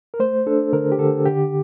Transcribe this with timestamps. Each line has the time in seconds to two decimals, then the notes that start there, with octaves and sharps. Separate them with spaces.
0.14 A#4
0.20 A3 C5
0.46 D4 A4
0.73 D3 A#4
0.92 G4
0.99 D3 A4
1.26 D3 G4